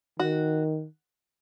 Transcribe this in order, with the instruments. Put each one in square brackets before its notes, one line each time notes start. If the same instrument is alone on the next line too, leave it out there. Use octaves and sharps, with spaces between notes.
[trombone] D#3 [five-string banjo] F#4